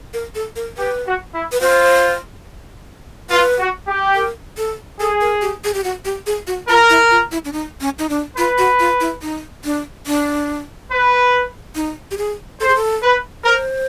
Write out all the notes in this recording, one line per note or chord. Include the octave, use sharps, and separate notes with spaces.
A#4
A4
A#4
G4 B4
F#4
E4
B4
F4 C5
F4 B4
F#4
G4
A#4
A4
G#4 A4
A#4
G4
G#4
G4
F#4
G4
G#4
F#4
F4 A#4
E4
F4
E4
D4
D#4
C#4
D#4
D4
F4 B4
F#4
F4
E4
D#4
D4
D4
B4
D#4
G4
G#4
A4 C5
G#4
A4
B4
A#4 C5